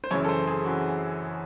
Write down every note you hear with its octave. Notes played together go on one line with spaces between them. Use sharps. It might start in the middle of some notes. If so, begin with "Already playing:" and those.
C5
F#2 C#3 E3 C#5
A4
C5
G#4
C#3 E3 F#4